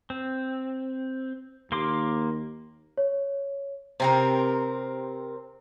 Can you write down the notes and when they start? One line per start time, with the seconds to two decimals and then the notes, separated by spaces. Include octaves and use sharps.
0.10 C4
1.72 D#2 A#3 C6 D6
2.97 C#5
4.00 C3 C4 A#4 C5